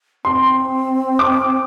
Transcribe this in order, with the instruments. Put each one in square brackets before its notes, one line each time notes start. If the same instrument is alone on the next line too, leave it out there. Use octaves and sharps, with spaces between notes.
[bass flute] C4 [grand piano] C6
[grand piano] D6